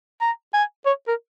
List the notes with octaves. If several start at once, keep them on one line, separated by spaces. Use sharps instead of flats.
A#5
G#5
C#5
A#4